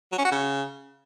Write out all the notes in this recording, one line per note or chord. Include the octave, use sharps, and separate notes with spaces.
F#3
C#4
F#4
C#3